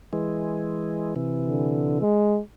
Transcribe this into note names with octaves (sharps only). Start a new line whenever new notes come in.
E3 G#3
C3 E3
D3
G#3